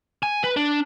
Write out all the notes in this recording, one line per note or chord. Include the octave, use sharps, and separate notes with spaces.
G#5
B4
D4